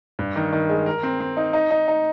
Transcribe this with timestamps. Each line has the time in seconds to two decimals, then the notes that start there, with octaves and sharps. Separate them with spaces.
0.19 G2
0.36 D#3
0.53 D#3
0.69 G#3
0.86 A#4
1.03 C4
1.20 C4
1.37 D#4
1.53 D#4
1.71 D#4
1.88 D#4